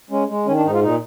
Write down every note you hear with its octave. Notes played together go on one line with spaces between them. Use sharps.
G#3 C#4
G#3
D#3 C#4
D4
G#2 D#4
F4
A#2 D#4